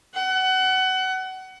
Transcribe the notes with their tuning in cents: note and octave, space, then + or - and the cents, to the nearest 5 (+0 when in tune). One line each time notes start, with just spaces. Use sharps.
F#5 +25